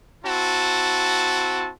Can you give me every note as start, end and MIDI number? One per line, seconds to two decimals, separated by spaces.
0.24 1.70 60
0.24 1.70 64
0.24 1.70 66
0.24 1.70 81